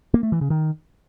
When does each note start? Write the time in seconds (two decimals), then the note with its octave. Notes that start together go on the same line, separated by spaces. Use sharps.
0.14 A#3
0.23 A3
0.32 E3
0.41 C#3
0.50 D#3